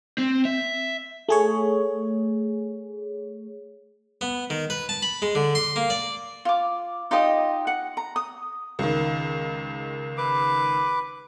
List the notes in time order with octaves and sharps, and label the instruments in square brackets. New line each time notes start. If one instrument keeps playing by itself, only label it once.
[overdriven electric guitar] C4
E5
[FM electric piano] A3 G#4 C#5
[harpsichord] B3
D#3
B4
A5
B5
G#3
D3
C6
A#3
D5
[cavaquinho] F4 D6
D#4 F4 G4 D#5
F#5
A#5
D#6
[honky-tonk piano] C#2 D#3
[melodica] B4 D6